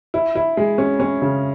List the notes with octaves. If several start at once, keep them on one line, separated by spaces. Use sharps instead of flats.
E4
E4
G#3
C#4
C#4
C#3